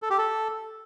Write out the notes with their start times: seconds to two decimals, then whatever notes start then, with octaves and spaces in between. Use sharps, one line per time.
0.02 A4
0.10 G4
0.18 A4